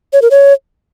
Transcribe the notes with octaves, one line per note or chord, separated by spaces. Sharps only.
C#5
A#4
C#5